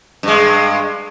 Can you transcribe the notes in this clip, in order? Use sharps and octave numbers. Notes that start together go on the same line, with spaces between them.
G2 G#3